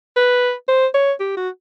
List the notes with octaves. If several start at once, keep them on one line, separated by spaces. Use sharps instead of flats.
B4
C5
C#5
G4
F#4